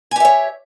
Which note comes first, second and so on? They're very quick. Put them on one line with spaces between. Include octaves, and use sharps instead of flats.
G#5 G4 E5 C#5